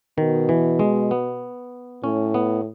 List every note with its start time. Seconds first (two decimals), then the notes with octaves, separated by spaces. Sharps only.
0.18 B2 D#3
0.49 E3
0.79 G#3
1.11 B3
2.03 A2 C#4
2.34 B3